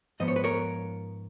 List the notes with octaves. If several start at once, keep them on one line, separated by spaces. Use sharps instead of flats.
G#2 F3 B3 D#5
C#5
B4
A#4 C#5